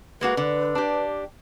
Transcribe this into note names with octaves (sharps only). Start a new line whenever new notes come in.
G#3 A#3 F#4 B4
D3
D4 G4